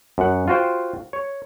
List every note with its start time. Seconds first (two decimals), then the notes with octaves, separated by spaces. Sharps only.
0.18 F#2 F#5
0.48 F4 F#4 C5 G5
1.13 C#5